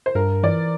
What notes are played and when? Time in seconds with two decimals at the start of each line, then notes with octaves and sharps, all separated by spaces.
0.06 C5
0.15 G2 A#4
0.43 E3 D5